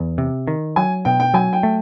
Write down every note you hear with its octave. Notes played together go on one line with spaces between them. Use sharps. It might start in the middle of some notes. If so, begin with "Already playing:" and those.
Already playing: E2
C3
D#3
F#3 G#5
B2 G5
G5
F#3 G#5
G5
A3